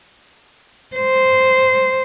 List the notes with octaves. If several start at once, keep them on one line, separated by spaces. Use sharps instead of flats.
C5